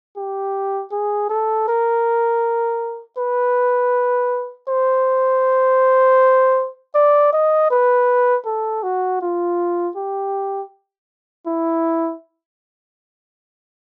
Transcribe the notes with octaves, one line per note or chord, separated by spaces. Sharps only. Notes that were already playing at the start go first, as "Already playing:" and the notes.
G4
G#4
A4
A#4
B4
C5
D5
D#5
B4
A4
F#4
F4
G4
E4